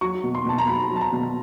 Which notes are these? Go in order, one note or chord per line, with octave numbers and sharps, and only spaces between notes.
F#3 C#6
B2
C6
B2 A5
A#5
F#3 B5
F#3
A5
A#5
B2